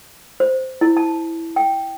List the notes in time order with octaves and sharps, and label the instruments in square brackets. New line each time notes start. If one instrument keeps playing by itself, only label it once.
[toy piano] C5
E4
A5
G5